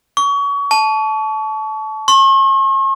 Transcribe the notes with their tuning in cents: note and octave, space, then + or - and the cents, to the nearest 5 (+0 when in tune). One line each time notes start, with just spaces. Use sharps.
C#6 +30
A5 -20
C#6 -45